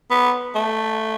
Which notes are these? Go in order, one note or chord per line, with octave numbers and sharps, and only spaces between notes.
B3
A3